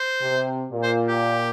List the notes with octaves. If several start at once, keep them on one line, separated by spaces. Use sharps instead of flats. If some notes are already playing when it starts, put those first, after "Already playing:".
Already playing: C5
C3
A#2
C5
G4